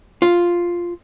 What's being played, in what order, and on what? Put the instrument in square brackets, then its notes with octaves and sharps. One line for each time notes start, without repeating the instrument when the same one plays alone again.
[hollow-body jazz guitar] F4